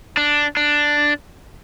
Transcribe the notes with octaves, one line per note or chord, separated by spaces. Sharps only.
D4
D4